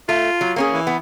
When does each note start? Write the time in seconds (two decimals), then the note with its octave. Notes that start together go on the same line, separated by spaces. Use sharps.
0.09 A3 F4
0.41 F#3
0.56 A#3 C#4 G#4
0.73 E3
0.87 B3